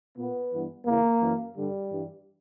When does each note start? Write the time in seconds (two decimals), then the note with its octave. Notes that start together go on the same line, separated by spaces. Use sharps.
0.16 A#2 B3
0.52 G2 E3
0.85 E2 C#3 E3 A#3
1.20 F#2 E3
1.55 G2 D3 G3
1.90 G2 E3